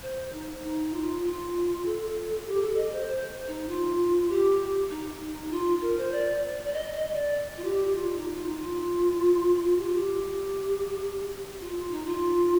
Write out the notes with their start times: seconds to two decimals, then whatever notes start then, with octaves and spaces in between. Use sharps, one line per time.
0.02 C5
0.33 D#4
0.63 D#4
0.94 F4
1.25 F4
1.86 A4
2.47 G4
2.61 A4
2.77 D#5
2.92 C5
3.07 C5
3.48 D#4
3.68 F4
4.29 G4
4.90 D#4
5.51 F4
5.82 A#4
5.97 C5
6.12 D5
6.65 D5
6.73 D#5
6.93 D#5
7.13 D5
7.57 F4
7.64 G4
7.95 F4
8.15 D#4
8.36 F4
8.46 D#4
8.57 F4
9.78 G4
9.86 F4
9.95 G4
11.61 F4
11.75 F4
11.91 D#4
12.06 F4